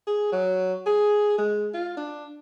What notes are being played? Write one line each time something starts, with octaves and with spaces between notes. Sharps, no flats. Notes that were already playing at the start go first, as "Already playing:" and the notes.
G#4
F#3
G#4
G#3
F4
D4